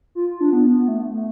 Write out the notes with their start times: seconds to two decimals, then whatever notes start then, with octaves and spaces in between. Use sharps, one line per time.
0.15 F4
0.41 D4
0.53 B3
0.65 B3
0.79 B3
0.88 A3
1.10 A3